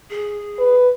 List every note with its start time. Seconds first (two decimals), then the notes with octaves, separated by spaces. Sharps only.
0.10 G#4
0.58 B4